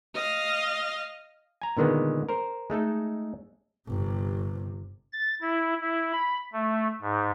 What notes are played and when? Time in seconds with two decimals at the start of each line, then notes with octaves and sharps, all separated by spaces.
0.15 D#5 F5
1.62 G#5 A#5
1.77 A#2 D3 D#3 G#3 B3
2.29 A#4 C5
2.70 G#3 A3 D#4 A4
3.87 G1 C3
5.13 A6
5.41 E4
5.81 E4
6.12 B5
6.53 A3
7.02 G#2